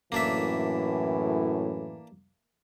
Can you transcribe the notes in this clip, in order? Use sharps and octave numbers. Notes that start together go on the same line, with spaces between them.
F#2 A2 E3 A#3 D4 E5